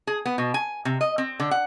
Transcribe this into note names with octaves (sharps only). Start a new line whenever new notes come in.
G#4
B3
B2
G#5
C3
D#5
C4
D3
F#5